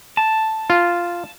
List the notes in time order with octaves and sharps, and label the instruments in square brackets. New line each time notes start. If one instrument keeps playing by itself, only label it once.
[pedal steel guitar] A5
[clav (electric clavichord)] F4